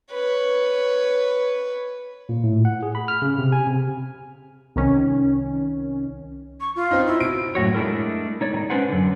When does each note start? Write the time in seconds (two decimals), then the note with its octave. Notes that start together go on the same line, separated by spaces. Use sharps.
0.11 B4 C#5
2.29 A#2
2.44 A2
2.65 F#5
2.83 G#4
2.95 B5
3.08 F6
3.22 C#3
3.38 C3
3.52 G#5
3.67 C3
4.76 C2 D#3 C#4
6.61 C#6
6.76 F4
6.91 C4 D#4
7.07 E4
7.20 B2 D7
7.55 F#2 A2 F#4 C#5
7.74 G#3 A3 D4 E4 G#4 A#4
8.41 D#4 C#5 D5
8.53 A2 D#4
8.70 C#4 D4 B4 C5 F#5
8.89 F#2 D3